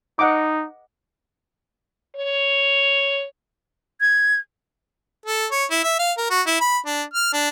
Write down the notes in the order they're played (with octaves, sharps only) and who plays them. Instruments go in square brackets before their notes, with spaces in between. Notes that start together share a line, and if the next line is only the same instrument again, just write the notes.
[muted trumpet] D#4 [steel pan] D#5 F#5 D6
[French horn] C#5
[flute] G#6
[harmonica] A4
C#5
E4
E5
F5
A#4
F#4
E4
B5
D4
F6
D4